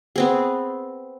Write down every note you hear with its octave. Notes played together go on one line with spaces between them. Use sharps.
B3 C4 G#4